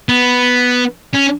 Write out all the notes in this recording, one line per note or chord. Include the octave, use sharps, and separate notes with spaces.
B3
C#4